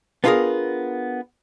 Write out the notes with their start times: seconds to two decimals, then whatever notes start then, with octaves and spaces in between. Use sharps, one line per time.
0.24 B3 D4 F4 F#4 G#4 A#4